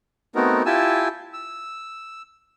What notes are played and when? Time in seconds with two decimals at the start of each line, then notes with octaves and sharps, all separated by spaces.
0.35 A3 B3 C4 D#4 F#4 A#4
0.66 E4 F4 G4 G#5 A5 E6
1.33 E6